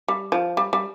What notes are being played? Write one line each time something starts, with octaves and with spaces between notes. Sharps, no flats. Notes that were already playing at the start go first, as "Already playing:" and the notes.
G3
F3
G3
G3